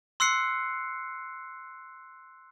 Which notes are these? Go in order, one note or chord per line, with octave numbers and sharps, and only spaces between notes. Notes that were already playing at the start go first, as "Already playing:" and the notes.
C6 E6 F#6 C7 C#7